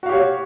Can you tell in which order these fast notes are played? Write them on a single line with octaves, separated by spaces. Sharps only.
F#4 F5 G4 C#5